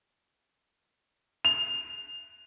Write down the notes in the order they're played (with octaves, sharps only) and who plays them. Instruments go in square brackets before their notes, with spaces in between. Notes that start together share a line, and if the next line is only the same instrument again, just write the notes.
[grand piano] F7